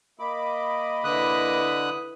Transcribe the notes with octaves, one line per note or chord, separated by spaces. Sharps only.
A#3 D#5 B5 D6
D3 E4 B4 D#6 F#6